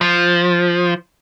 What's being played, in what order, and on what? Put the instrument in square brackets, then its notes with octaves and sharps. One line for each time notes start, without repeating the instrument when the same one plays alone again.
[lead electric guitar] F3